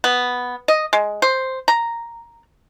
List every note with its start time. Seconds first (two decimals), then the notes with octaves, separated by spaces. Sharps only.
0.04 B3
0.68 D#5
0.93 G#3
1.22 C5
1.68 A#5